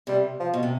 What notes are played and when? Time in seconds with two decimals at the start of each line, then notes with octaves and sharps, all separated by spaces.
0.07 C3 G3
0.40 F3
0.54 B2
0.63 C3